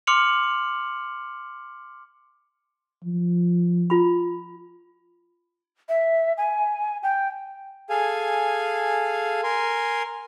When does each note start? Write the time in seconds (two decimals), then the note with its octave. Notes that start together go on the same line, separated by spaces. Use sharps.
0.07 C6 D6 F6 C#7 F7 F#7
3.04 F3
3.90 F4 B5
5.89 E5
6.37 G#5
7.03 G5
7.90 G#4 A4 F5 G#5
9.43 A#4 G#5 C6